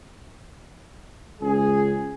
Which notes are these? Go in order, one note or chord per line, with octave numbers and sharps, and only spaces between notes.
C#2 G#4